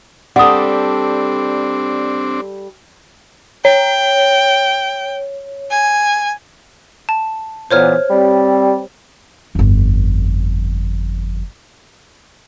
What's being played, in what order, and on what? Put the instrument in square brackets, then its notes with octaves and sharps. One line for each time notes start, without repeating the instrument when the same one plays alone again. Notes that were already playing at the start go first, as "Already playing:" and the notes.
[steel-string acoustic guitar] G3 A4 [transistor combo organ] C4 D4 [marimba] F#5 D#6
[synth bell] C#5 [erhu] G5
[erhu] G#5
[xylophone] A5
[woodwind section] A#2 E3 B3 [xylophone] C5 C#5 F6
[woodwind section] G3 C4
[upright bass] G1 F2